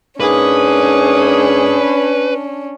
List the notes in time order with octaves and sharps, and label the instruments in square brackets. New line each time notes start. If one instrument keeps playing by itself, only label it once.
[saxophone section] G#2 A#3 G#4 [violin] C#4 D4 [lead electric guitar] B4